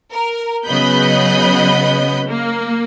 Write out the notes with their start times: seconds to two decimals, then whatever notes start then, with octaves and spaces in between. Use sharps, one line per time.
0.11 A#4
0.66 C#3 F#3 B3 D#5 B5 G6
2.28 A#3